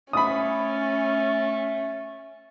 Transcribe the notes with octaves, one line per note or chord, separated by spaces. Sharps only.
A3 C#4 B5 D#6